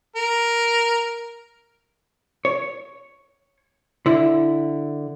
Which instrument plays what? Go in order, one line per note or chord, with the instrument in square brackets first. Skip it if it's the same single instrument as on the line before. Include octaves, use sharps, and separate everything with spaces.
[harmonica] A#4
[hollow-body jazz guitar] C#5
D3 E4